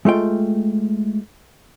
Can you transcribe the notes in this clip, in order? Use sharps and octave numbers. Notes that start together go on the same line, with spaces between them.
G#3 A3 F4 G5